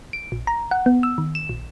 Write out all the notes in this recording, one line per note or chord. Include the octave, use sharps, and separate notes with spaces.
D7
A#1
A#5
F#5
B3
E6
D#3
E7
A#1